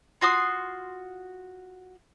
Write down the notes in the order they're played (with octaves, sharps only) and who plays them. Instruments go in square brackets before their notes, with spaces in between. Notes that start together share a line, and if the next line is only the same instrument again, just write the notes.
[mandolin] F4 F#4 C6 D#6